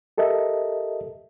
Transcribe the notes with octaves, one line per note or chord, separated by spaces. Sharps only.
G4 A4 A#4 D#5 E5